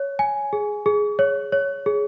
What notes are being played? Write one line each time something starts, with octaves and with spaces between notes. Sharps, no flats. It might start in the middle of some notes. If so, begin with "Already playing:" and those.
Already playing: C#5
G#5
G#4
G#4
C#5
C#5
G#4